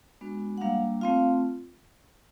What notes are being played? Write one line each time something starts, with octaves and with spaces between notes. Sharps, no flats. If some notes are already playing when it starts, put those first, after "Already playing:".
G#3 B3 D4 F#4
F#5
G3 A#3 D4 F5
A3 C4 F4 F5